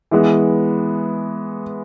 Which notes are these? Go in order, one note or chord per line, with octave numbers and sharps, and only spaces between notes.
E3 G#3 B3